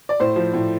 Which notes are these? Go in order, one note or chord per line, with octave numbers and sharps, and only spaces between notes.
D5
A2 C5
F3
A2